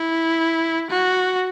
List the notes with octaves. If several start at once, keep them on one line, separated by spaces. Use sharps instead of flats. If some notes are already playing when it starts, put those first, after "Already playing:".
Already playing: E4
F#4